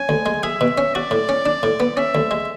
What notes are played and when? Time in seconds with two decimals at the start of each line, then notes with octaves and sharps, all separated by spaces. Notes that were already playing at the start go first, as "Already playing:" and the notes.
Already playing: C#4 G#5
0.09 D2
0.26 G#3
0.43 G#4 E5
0.61 B2
0.78 C#4
0.95 F#4 D5
1.11 A2
1.29 C#4
1.46 D4
1.63 A2
1.80 B3
1.97 C#4 E5
2.15 D2
2.31 G#3